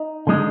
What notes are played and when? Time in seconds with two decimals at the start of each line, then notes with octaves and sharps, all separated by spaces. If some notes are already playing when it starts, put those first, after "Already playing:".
Already playing: D#4
0.27 D3 G#3 D#4